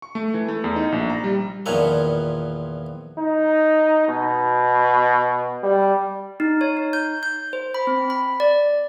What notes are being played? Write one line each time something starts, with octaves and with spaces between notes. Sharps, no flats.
C#6
A3
E3
A3
E2
D#4
A#1
A#5
G3
E2 A#2 D#3 F3 B4 C#5
D#4
B2
G3
D#4
C#5
D#4
G6
G6
C5
B5
C4
B5
D5